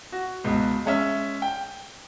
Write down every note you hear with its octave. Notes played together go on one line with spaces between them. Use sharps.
F#4
C#2 B2
G#3 C#4 E5
G5